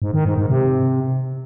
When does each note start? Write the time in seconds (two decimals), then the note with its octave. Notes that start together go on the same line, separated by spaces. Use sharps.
0.02 G#2
0.14 D#3
0.25 G#2
0.37 G#2
0.49 C3